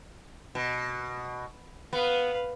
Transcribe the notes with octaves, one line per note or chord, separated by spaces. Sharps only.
B2
B3 B4 F5